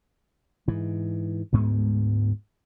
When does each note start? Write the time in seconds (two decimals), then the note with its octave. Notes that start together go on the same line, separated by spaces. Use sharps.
0.68 G#2 E3
1.53 D2 G#2 G#3 B3